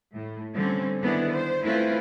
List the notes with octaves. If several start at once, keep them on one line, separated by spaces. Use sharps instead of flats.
A2
D3 G3 C4 C#4
D3 D#3 B3 D4 E4 G#4
C5
A3 C4 C#4 E4 F4 B4